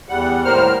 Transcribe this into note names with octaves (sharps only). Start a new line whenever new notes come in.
E2 G3 F#5
D#2 A2 G3 A#4 C5 F6